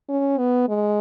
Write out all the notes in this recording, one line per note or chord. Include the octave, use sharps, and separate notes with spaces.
C#4
B3
G#3